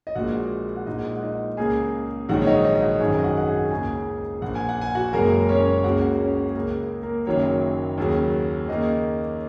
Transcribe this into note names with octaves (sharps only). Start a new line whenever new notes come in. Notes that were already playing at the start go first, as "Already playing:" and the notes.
D#5
A#1 A#2 G#3 F#4 F#5
F#5
A#1 A#2 G#3 D#4 D#5
F#5
D#4 D#5
C#2 C#3 A#3 G#4 G#5
A#1 G#2 D#3 F#3 F#4 F#5
C#5
D#4 D#5
D#4 D#5
D#5
F#4 F#5
G#1 F#2 D#3 G#4 G#5
D#5
F#4 F#5
F#5
G#4 G#5
C#2 C#3 A#3 G#4 G#5
A#1 A#2 A#3 F#5
G#5
F#5
G#5
F#4 F#5
F#1 F#2 C#3 G#3 A#3 A#4
C#4 C#5
C#2 C#3 A#3 F#4 F#5
C#4 C#5
G#4
C#2 C#3 A#3 A#4
G#4
A#3 A#4
F#1 F#2 D#3 F#3 A#3 C#4 C#5
D#2 C#3 F#3
D#2 C#3 A#3 D#4 D#5